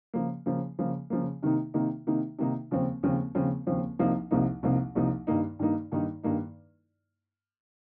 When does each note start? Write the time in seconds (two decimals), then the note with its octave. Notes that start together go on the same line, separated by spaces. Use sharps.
0.14 C#3 F3 A#3
0.46 C#3 F3 A#3
0.79 C#3 F3 A#3
1.10 C#3 F3 A#3
1.43 C3 D#3 A#3 D#4
1.74 C3 D#3 A#3 D#4
2.07 C3 D#3 A#3 D#4
2.39 C3 D#3 A#3 D#4
2.71 D#2 C#3 F3 C4
3.03 D#2 C#3 F3 C4
3.35 D#2 C#3 F3 C4
3.67 D#2 C#3 F3 C4
3.99 C2 C3 F3 A#3 D#4
4.31 C2 C3 F3 A#3 D#4
4.63 C2 C3 F3 A#3 D#4
4.95 C2 C3 F3 A#3 D#4
5.27 G2 D#3 A#3 D#4
5.59 G2 D#3 A#3 D#4
5.92 G2 D#3 A#3 D#4
6.23 G2 D#3 A#3 D#4